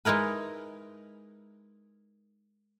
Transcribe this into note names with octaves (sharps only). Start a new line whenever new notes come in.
G#3 D#4 E4 A#4 B4